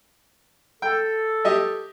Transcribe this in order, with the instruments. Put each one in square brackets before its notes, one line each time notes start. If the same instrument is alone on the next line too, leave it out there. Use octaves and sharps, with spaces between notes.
[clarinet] A4 [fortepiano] G5
[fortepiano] G4 D#5 E5